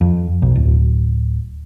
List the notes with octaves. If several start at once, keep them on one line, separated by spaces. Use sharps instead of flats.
F2
B1
D1